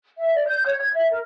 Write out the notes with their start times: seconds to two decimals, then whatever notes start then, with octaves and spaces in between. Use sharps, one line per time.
0.19 E5
0.34 D5
0.46 G6
0.66 C#5
0.81 G#6
0.93 E5
1.10 A#4